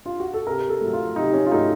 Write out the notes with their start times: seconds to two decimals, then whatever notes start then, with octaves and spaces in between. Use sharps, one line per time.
0.06 F4
0.20 F#4
0.34 A4
0.47 C3 A#4
0.69 A4
0.81 F#3 A3
0.93 F4
1.16 C3 D#4
1.34 C#4
1.46 F4
1.51 F#3 A3 D#4